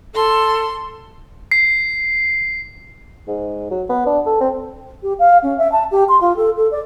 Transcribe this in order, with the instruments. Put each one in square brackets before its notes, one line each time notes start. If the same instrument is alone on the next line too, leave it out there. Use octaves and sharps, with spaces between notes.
[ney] A4 [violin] C6
[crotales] C7
[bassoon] G#2
F#3
B3
D4
A4
C4
[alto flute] G4
F5
C#4
E5
A5
G4
C6
F4
A4
A4
D5